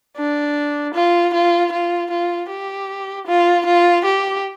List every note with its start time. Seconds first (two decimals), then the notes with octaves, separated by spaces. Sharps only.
0.17 D4
0.95 F4
1.34 F4
1.72 F4
2.11 F4
2.49 G4
3.27 F4
3.65 F4
4.05 G4